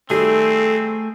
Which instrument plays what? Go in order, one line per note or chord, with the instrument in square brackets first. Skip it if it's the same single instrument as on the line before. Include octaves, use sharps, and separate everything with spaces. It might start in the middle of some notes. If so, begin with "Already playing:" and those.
[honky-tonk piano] D#3 G3 [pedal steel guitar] A3 G#4 [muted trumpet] C4 [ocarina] A4